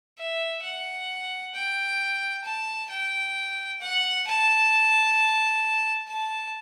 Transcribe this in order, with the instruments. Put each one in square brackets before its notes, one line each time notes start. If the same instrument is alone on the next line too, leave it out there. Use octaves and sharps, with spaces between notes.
[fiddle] E5
F#5
G5
A5
G5
F#5
A5
A5